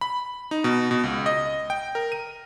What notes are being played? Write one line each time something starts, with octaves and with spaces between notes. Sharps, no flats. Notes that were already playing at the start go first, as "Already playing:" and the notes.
B5
D#4
B2
B2
C#2
D#5
G5
A#4
D#7